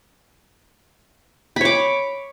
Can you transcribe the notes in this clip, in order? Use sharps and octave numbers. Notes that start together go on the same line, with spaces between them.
C#5 B5 D6